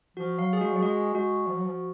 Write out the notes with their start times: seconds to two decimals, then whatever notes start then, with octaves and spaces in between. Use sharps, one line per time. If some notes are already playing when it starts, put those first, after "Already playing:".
0.17 F3 F#4
0.38 F#3 F5
0.53 G#4
0.60 G#3 F#4
0.72 F#3 G#4
0.82 G#3 F#4
1.15 G#3 F#4
1.48 F3
1.57 F#3
1.66 F3